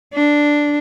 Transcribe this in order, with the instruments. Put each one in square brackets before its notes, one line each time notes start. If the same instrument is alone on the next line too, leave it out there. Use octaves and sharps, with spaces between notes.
[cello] D4